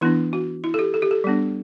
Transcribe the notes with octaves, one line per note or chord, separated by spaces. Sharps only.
E3 B3 D4 E4
F#4
E4
A4
G4
A4
G4
A4
G3 B3 D4